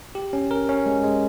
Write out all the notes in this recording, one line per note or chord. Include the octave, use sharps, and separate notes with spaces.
G4
C#4
A#4
C#4
G#3
G#3